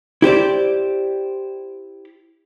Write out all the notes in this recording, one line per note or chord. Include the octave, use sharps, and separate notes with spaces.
E4 G4 C5 D5